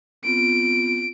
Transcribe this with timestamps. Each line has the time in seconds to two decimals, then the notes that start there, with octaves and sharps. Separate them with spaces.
0.25 B3 C4 F4 D7